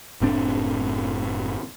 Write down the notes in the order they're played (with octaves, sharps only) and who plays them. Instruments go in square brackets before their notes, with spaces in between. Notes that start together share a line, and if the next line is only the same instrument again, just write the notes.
[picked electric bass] F#1 A2 C4 D4